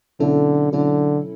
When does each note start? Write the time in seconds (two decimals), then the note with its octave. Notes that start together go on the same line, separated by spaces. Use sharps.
0.20 B2 D3 F#3 C#4 E4 A4
0.73 B2 D3 F#3 C#4 E4 A4